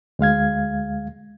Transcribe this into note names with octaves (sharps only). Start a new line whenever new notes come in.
D2 G#3 F5 G#6